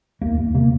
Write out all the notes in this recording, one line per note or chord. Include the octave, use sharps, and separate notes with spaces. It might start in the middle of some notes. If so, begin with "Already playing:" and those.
D#2 A#3
D#2
C3 A#3